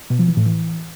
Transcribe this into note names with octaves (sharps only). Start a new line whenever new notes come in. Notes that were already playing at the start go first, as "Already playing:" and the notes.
B2
F3
E3
A2
E3